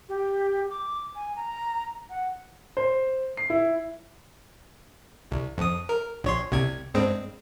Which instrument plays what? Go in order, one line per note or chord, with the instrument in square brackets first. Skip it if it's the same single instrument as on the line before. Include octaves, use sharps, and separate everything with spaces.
[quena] G4
D6
G#5
A#5
F#5
[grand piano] C5
C7
E4
[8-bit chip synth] C2
F2 D#6
A#4
A#1 C#5 C6
C2 C3 G#6
G2 G#3 C4